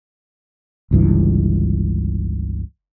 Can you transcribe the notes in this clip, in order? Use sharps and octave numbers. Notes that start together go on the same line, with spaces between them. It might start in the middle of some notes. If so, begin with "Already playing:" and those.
G1 C#2 G2 E3